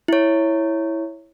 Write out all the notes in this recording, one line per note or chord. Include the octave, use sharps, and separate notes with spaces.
E4 C#5